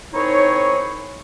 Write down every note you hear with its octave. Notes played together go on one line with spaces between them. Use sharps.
D#3 C4 D#4 E4 G#4 C#5